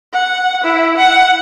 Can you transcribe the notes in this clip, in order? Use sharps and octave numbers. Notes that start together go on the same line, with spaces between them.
F#5
E4
F#5